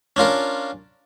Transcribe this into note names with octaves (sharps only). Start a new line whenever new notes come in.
C#4 D4 F4 A#4